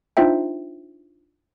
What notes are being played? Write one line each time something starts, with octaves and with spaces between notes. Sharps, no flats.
D4 D#4 F4 C5 E5 G5